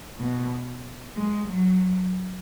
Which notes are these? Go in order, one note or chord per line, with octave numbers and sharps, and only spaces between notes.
B2
G#3
F#3